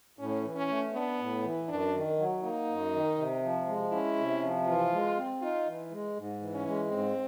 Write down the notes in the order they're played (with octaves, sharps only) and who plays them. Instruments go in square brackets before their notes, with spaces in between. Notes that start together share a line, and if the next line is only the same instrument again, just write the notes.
[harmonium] A2 [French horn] C#4
[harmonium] E3
[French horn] C#4
[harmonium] A3
[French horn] B3 [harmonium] D4
[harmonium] A2
E3
[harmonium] F#2 [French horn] D4
[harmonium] D#3
F#3
[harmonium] A#3 [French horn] D#4
[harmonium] F#2
D#3
C3
F3
G#3
[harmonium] C#4 [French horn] E4
[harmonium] C3
F3
[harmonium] E3 [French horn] F4
[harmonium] G#3
C4
[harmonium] D#4 [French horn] F4
[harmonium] E3
G#3
G#2
E3
[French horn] C#4
[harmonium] G#3
[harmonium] G#2 [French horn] C4